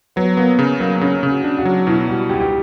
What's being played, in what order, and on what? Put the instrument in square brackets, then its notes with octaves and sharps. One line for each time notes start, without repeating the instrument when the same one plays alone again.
[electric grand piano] F#3 [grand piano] B3
[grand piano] A#3 [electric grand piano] B3
[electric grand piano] C#3
[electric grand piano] F#3 [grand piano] A#3
[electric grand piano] C#3 [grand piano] C#4
[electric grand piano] C#3
[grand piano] F#4
[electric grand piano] D4
[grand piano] F#4
[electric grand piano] F#3
[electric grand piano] B2 [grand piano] E4
[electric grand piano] G3 [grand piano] F#4
[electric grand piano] C#2 [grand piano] G4
[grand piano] G4